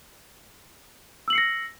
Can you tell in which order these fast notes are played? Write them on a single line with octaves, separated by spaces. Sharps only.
E6 F#7 C7 C#7 A#6